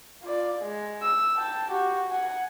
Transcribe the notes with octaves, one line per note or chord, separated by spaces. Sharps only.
F4 D5
G#3
E6
G5 A5
F#4 G4
F#5 G#5